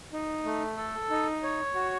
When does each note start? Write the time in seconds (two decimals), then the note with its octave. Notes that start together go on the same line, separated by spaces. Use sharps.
0.13 D#4
0.45 A3
0.77 A4
1.10 D#4
1.43 C#5
1.75 F#4